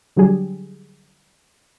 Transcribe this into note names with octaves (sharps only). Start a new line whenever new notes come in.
D3 F#3 G3 G4 G#4